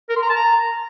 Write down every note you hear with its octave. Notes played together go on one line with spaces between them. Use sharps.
A#4
C6
A#5
A5
A#5